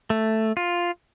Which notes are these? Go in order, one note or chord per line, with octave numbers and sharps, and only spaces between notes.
A3
F4